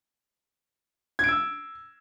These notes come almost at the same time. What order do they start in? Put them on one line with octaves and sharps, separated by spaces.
G#6 D7 E6